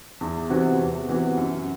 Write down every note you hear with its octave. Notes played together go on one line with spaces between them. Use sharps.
E2
C3 E3 B3 F#4
E2
C3 E3 B3 F#4
F#2